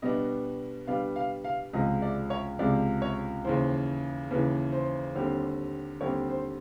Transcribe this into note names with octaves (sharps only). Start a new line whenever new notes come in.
B2 G3 B3 D4 D#5
B2 G3 B3 D4 F5
F5
F5
C#2 C3 F3 G#3 D#5
D5
C#5
C#2 C3 F3 G#3 D5
C#5
D#2 C#3 E3 C5
D#2 C#3 E3 B4
C5
D#2 D3 G3 C4
D#2 D3 G3 C4 C#5
C5